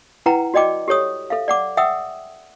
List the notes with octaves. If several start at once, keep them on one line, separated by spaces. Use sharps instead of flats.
E4 B4 F#5 G5 A#5
F#4 D5 D#5 G5 D6
G4 A4 C#5 D#6
A4 E5 F5
D5 F#5 D6
E5 F#5 G5 D#6 E6